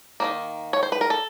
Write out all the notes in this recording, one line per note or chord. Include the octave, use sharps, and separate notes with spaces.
D#3 F#3 A#3
C#5
C5
B4
A#4
A4